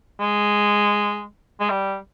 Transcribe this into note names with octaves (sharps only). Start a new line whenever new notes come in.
G#3
G#3
G3